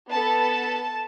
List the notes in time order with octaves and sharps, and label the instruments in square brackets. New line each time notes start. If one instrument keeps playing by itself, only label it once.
[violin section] B3 A4 A5